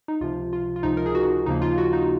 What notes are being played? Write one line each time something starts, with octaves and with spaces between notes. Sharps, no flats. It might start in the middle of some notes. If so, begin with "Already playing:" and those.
D#4
C#2 C3 F3 F4
F4
F4
C#2 C3 F3 D#4
A#4
G#4
F#4
D#2 C#3 F3 A#3 D#4
F4
F#4
D#4